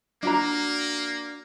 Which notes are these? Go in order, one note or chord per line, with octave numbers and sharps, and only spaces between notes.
A#3 D4 F#4 A#5